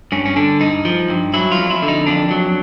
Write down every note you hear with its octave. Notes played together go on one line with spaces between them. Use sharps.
G2 C#4
C#4
D3 D4
G2 D#4
F3
G2
F#3 E4
F4
F2
E4
D3
D#4
F2 D4
F#3